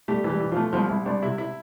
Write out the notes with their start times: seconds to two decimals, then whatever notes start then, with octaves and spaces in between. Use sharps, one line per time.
0.08 G3 A3 G4
0.24 E3
0.29 G3 G4
0.40 E3
0.52 F3 A3 F4
0.73 C2 F3 F4
0.89 C2 E4
1.05 C2 D4
1.22 C3 E4
1.38 E4